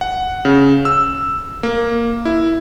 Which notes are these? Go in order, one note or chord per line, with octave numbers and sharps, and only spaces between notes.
F#5
C#3
E6
A#3
E4